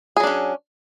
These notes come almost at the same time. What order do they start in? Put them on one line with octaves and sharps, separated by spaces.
G#4 F#3 D4 C#4